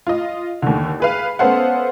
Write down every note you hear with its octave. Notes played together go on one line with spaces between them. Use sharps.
F4 D#5
D#2 D3
G#4 B4 F5
B3 C#4 A4 C5 F5 F#5